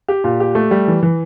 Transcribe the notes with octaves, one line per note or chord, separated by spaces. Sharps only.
G4
A#2
G4
A3
G3
E3
E3